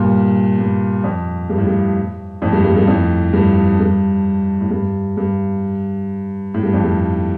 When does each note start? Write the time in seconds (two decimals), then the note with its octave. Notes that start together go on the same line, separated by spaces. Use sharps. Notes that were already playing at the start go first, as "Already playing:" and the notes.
Already playing: G2 A#2
0.58 G2
1.04 F2
1.50 G2
1.58 A2
1.66 G2
2.42 F2 A2
2.53 G2
2.64 G2
2.76 G2
2.88 F2 A2
3.33 G2
3.80 G2
4.61 A2
4.71 G2
5.17 G2
6.54 A2
6.63 G2
6.73 F2
6.84 G2